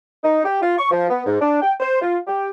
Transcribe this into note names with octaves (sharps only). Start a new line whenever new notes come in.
D#4
G4
F4
C#6
F3
B3
G#2
D4
G5
C5
F4
G4